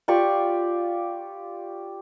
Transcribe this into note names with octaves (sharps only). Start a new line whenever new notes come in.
F4 G4 D5 C#6